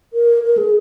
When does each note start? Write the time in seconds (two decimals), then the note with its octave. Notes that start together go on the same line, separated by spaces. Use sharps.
0.13 A#4
0.43 A#4
0.58 G#4